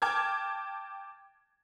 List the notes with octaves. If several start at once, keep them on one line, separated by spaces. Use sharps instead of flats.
G5 A5 D6 F6 G#6